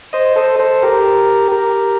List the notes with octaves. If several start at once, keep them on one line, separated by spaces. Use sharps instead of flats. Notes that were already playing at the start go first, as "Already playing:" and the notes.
C5 D#5
A4 C5
A4 C5
G4 A#4
G4 A#4